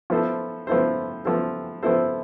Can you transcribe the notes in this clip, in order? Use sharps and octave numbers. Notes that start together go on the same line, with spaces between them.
F3 B3 E4 A4 C5
F3 B3 E4 A4 C5
F3 B3 E4 A4 C5
F3 B3 E4 A4 C5